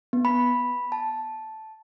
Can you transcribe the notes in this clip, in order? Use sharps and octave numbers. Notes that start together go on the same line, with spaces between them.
B3
B5
A5